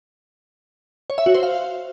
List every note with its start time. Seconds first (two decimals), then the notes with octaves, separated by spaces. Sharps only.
1.10 C#5
1.18 E5
1.26 F#4
1.35 C5
1.43 F5